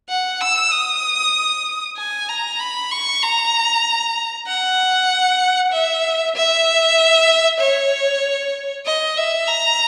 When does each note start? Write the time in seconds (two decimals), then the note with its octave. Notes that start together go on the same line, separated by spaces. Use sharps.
0.09 F#5
0.41 E6
0.71 D#6
1.97 G#5
2.29 A#5
2.59 B5
2.91 C#6
3.22 A#5
4.47 F#5
5.72 E5
6.36 E5
7.60 C#5
8.85 D#5
9.17 E5
9.48 A#5